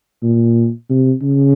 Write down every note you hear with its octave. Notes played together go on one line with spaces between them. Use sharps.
A#2
C3
C#3